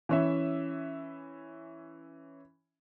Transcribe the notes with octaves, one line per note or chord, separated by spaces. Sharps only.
E3 C#4 E5